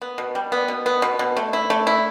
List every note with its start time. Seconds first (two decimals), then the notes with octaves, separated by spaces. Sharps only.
0.02 B3
0.18 B2
0.35 G3
0.52 B3
0.68 B2
0.86 B3
1.02 B2
1.19 B2
1.37 A3
1.53 E4
1.70 A3
1.87 E4